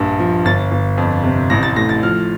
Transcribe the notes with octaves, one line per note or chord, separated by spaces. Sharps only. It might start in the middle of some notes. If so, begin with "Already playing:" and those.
Already playing: A#1 G2
F3
G1 A6
G1
F2
C3
A1 A#6
A6
A2 A#6
A6
F3 F6